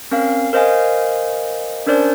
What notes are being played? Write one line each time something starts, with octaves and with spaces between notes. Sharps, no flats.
C4 C#4 A#4 F5
A#4 C5 D#5 F5 G#5
C#4 D4 A#4 C5 D5